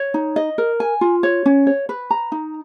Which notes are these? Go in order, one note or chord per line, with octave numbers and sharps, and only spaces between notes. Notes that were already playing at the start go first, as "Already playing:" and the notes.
Already playing: C#5
D#4
D#5
A#4
G#5
F4
C#5
C#4
C#5
B4
A#5
D#4